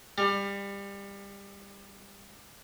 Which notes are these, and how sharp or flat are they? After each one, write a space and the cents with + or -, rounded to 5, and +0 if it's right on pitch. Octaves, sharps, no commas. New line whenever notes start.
G3 +25